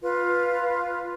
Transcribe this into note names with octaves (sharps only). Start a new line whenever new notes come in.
F4 B4